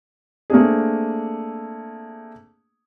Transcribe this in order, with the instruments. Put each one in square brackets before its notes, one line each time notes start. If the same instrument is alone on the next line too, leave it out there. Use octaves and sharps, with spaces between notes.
[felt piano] A3 A#3 C4 D4 G#4